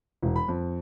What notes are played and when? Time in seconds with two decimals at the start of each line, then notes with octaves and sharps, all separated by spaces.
0.23 E1
0.36 B5
0.48 F2